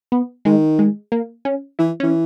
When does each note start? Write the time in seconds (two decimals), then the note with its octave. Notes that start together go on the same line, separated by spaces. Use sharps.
0.12 B3
0.45 D#3 G#3
0.79 G#3
1.12 A#3
1.45 C#4
1.79 E3 E4
2.00 E3 C#4